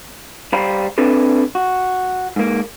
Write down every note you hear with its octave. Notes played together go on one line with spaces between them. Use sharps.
G3 C5 F5 A#5 B5
C4 D4 E4 A4 B4
F#4
G#2 A#3